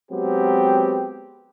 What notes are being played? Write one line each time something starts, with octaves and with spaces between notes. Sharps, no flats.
F#3 G#3 B3 C4 G4